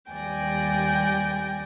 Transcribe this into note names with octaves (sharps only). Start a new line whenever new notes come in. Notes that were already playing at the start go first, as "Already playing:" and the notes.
D#2 G3 D5 G5 G#5 A#6